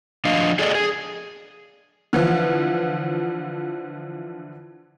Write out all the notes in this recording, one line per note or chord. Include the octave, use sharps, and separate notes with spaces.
F3 D4 D#5 F5
G#4 A4 D5 D#5
G#4
D3 E3 F3